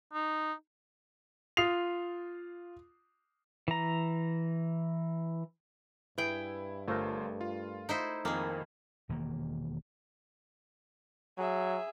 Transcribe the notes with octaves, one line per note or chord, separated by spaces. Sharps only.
D#4
F4 D#6 C7 F7
E3 A#5
G2 E4 G#4 B4 G5
G1 A3 F4 A#4 C5
F4
D#4 E4 C5
F2 D#3 A#3 G#4
E1 D#3 A#3
F#3 G#4 E5